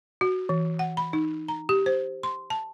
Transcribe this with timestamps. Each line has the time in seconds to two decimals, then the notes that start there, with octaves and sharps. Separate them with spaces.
0.21 F#4
0.49 E3
0.79 F#5
0.97 B5
1.13 D#4
1.48 A#5
1.69 G4
1.86 C5
2.23 C6
2.50 A5